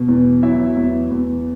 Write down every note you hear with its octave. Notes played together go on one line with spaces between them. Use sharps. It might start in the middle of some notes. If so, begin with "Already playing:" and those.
Already playing: B2
E2
F#3 E4 E5
E2
E2